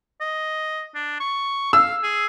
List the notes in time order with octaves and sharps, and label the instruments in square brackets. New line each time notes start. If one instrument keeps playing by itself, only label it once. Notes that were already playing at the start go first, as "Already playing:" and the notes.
[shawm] D#5
D4
C#6
[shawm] F5 [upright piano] E6
[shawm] G#4